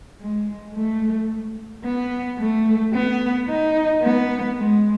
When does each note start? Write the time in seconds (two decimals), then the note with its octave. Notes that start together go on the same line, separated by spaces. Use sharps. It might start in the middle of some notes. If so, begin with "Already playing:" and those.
0.20 G#3
0.75 A3
1.84 B3
2.39 A3
2.93 B3
3.48 D#4
4.03 B3
4.57 G#3